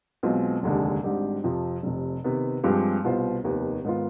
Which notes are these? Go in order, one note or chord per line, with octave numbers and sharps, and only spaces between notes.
B1 B2 G#3 C4 F4
F1 D#2 D3 G#3 D4
G#1 G#2 G3 D4 G4
F2 C3 F3
F1 F2 C3
C3 D#3 B3
G2 F3 G#3 C4 G4
C2 B2 B3 F4 C5
F1 D#2 D#3 B3
G#2 D#3 B3 F4